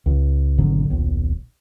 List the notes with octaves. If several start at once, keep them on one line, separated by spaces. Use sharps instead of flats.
C#2
G#1 B2 D3 F#3
D#1 B1